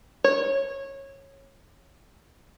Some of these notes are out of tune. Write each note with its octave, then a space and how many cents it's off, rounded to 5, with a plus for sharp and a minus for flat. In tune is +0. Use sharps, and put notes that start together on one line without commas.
C#5 -20